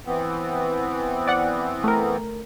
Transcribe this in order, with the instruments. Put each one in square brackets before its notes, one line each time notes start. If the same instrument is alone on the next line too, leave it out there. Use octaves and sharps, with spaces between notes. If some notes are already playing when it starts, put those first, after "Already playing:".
[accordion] E3 B3 C4
[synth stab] D5 F#5
A3 A#4